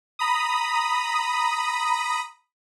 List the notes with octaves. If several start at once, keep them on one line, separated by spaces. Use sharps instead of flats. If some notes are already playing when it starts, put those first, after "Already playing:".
A#5 B5 D#6